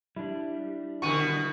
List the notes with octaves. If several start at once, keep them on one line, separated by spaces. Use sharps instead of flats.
G3 D4 E4
B2 D3 F#4 C#6 C#7 D#7